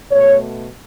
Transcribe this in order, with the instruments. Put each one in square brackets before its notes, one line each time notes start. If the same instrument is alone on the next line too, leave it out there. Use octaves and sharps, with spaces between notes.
[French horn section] B2 A3 C#5